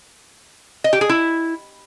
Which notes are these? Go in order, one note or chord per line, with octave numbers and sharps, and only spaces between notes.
D#5
G4
G#4
E4